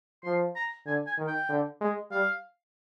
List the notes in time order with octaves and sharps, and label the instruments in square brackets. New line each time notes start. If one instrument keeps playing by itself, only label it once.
[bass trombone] F3 [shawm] C6
[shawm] A#5
[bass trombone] D3 [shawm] G#5
[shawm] G#5
[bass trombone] D#3
[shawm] G5
[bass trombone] D3
G#3
[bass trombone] G3 [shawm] F5